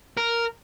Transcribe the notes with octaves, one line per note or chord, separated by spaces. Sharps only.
A#4